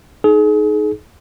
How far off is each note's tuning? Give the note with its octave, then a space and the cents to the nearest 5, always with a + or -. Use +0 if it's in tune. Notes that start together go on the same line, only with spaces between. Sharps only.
D#4 +0 G#4 +35